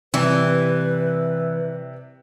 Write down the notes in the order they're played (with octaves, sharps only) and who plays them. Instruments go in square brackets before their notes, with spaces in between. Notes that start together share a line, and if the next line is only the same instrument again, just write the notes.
[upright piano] C3 G3 [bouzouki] E3 [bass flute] B4